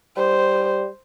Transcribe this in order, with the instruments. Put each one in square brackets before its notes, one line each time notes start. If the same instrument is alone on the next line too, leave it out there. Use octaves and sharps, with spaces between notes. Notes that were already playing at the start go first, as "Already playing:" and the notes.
[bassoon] G3 [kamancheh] C5